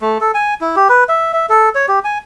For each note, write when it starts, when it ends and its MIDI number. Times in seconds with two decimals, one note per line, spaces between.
0.01 0.18 57
0.21 0.31 69
0.35 0.54 80
0.61 0.76 64
0.76 0.88 67
0.89 1.04 71
1.09 1.32 76
1.33 1.46 76
1.49 1.69 69
1.75 1.86 73
1.88 1.99 67
2.04 2.18 80